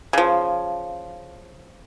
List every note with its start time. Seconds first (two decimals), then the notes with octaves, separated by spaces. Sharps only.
0.13 C#3 F3